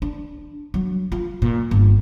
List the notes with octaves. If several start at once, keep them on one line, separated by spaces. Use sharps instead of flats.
D4
F#3
F4
A#2
G1